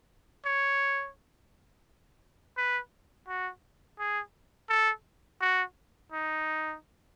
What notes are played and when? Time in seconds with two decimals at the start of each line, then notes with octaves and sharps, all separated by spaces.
0.45 C#5
2.57 B4
3.28 F#4
3.99 G#4
4.69 A4
5.41 F#4
6.12 D#4